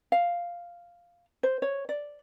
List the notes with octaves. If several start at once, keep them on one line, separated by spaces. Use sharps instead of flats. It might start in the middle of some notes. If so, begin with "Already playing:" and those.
F5
C5
C#5
D5